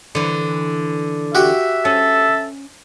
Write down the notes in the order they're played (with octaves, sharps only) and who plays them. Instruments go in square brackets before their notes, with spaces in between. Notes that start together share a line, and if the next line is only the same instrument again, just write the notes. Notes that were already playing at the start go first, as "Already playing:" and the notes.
[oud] D3 E3
[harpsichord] F#4 G4 [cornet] E5
[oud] C#4 [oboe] A4